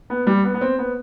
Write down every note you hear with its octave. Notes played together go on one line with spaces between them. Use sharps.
B3
G3
B3
B3
C4
B3